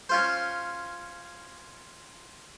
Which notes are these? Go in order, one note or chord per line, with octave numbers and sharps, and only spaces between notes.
C#4 F4 C5